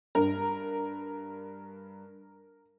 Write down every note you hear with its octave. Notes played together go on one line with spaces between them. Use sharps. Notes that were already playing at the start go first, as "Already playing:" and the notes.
G2 A#4